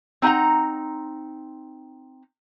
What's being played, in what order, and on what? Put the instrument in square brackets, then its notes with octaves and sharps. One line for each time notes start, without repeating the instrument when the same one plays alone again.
[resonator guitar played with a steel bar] C4 D#4 F5 F#5 A#5